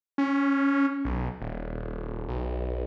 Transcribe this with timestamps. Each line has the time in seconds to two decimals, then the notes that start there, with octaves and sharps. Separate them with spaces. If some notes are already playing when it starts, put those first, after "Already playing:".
0.18 C#4
1.05 B1
1.41 D#1
2.28 B1